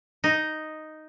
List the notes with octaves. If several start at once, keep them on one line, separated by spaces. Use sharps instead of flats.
D#4